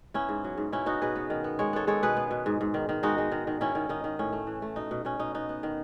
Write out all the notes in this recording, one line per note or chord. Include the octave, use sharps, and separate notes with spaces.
B3 C#4 E4
G#2
F#3
G#2
B2 C#4 E4
B3 D#4 F#4
B2 G#4 B4
B3
D#3
B3
G#3 C#5
B3 A4 C#5
G#3 A4 C#5
B2 G#4 B4
B3
B2
G#2
G#2
D#3
D#3
G#3 D#4 F#4
G#3
D#3
D#3
D#3 C#4 E4
D#3
D#3 D#4
D#3
A2 C#4
A3
E3
A3
B2 D#4
B2
B2 C#4
B2 D#4
B3 D#4
B3
D#3